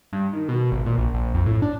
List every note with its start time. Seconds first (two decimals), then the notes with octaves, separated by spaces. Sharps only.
0.13 G2
0.33 D#3
0.48 B2
0.72 G#1
0.86 A#2
0.98 A#1
1.14 A#1
1.34 F2
1.46 A2
1.62 D4